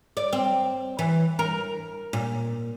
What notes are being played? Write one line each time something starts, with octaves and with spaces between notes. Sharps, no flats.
D5
C4
E3
A#4
A#2